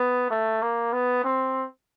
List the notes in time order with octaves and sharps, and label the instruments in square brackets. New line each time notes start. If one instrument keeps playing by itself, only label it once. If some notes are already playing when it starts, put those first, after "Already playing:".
Already playing: [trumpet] B3
A3
A#3
B3
C4